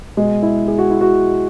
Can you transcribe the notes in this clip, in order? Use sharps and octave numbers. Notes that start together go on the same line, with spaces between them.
B2 G#3
E4
G#4
F#4
E4
F#4